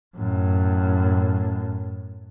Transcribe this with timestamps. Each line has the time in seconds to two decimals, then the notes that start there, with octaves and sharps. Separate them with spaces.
0.17 F#2 A2